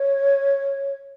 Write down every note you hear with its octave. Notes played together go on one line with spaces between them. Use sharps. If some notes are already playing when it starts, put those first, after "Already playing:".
Already playing: C#5